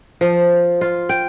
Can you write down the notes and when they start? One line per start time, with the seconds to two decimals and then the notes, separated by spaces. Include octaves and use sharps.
0.21 F3
0.81 F4
1.09 G5